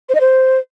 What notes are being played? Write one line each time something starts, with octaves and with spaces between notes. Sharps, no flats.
C5
D#5
C5